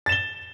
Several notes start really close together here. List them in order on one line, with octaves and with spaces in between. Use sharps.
A6 E7 G7